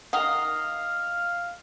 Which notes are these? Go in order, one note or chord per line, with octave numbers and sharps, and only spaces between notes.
D#3 A#4 D#5 F5 F#5